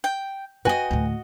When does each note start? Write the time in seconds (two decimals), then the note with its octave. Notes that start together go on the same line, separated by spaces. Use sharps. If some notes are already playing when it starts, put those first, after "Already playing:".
0.04 G5
0.65 F#4 B4 D#5 G5 G#5
0.91 D2 A2